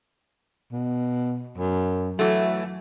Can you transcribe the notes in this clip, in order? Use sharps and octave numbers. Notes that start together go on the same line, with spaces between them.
B2
F#2
E3 F#3 A3